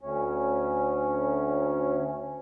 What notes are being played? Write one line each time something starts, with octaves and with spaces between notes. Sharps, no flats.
D2 C#4